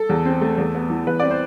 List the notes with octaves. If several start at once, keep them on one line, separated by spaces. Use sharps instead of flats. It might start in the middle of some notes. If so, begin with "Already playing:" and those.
Already playing: A4
E2
C4
A3
E2
B3
E3
E2 B4
C4 D5
C5